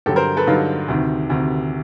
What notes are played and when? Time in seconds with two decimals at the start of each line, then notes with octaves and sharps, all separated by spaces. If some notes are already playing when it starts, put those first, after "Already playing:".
0.06 G2 D3 F#3 G4 A4
0.16 A#4 C5
0.37 A4 B4
0.47 G2 D3 F#3 D#4 F4
0.88 D2 C3 D#3
1.30 D2 C3 D#3